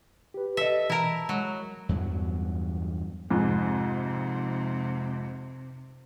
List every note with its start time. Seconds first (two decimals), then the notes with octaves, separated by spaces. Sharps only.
0.34 G4 B4
0.57 A4 D#5 E5
0.90 B2 E3 E4 A#4 A5 A#5
1.29 F#3 G#3
1.89 E2 G2 F#3
3.30 F2 G#2 C3